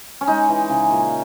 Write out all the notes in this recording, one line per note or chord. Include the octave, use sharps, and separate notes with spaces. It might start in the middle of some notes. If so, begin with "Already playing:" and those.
C#4
G#3 D#4
E3
C#3
A#2